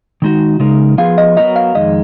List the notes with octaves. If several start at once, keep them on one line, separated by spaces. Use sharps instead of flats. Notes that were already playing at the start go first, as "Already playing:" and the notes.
D#3 G#3 D#4 F#4
C#3 G#3 D#4 A#4
F3 B3 F4 G#4 F5
D#5
F#3 B3 F#4 A#4 D#5
F5
F2 D#3 G#3 D#5